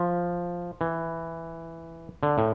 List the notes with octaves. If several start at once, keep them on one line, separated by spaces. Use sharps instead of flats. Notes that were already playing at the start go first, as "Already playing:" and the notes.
Already playing: F3
E3
D3
A2